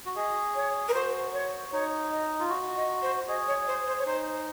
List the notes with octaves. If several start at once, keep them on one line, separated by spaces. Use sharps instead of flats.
F#4
G#4 D#5
C#5
A#4
F#4 C5
C#5
D#4 C#5
D#5
F4
F#4 D#5
D#5
C5
G#4 D#5
C#5
C5
C5
C#5
D#4 C5